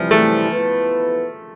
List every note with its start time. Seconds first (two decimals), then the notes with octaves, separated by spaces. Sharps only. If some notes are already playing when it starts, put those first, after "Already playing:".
Already playing: C3 E3 F3 G3 C4 E4
0.11 A3
0.50 F3 B3 E4 B4